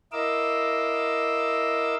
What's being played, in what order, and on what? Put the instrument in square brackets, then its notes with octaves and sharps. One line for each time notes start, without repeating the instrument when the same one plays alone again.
[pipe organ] E4 A#4 D#5 F5 D6 E6